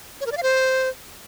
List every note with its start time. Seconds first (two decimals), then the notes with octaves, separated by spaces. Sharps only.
0.21 C#5
0.26 A#4
0.32 D5
0.37 F5
0.43 C5